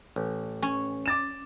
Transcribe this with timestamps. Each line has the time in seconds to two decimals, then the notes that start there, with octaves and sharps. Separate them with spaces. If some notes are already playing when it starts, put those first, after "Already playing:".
0.16 A1
0.62 C#4
1.06 D6 A6 E7